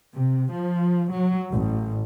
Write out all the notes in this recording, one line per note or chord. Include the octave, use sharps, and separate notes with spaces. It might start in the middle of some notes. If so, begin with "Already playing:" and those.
C3
F3
F#3
A1